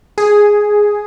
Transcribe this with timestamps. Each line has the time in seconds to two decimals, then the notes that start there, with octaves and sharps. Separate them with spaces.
0.18 G#4